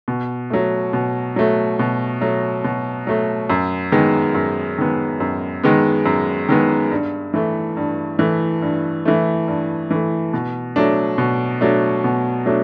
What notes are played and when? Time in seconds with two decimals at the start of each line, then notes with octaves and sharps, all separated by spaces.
0.08 B2
0.50 F#3 A3
0.93 B2
1.36 F#3 A3
1.79 B2
2.21 F#3 A3
2.64 B2
3.07 F#3 A3
3.50 F#2
3.92 D#3 G#3 B3
4.35 F#2
4.78 D#3 G#3 B3
5.20 F#2
5.63 D#3 G#3 B3
6.06 F#2
6.49 D#3 G#3 B3
6.91 G2
7.34 E3 A3
7.77 G2
8.19 E3 A3
8.62 G2
9.05 E3 A3
9.48 G2
9.91 E3 A3
10.33 B2
10.76 F#3 A3 D4
11.18 B2
11.61 F#3 A3 D4
12.04 B2
12.46 F#3 A3 D4